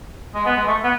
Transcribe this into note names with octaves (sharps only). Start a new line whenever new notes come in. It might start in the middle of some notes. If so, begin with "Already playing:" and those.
G#3
B3
G#3
A3
B3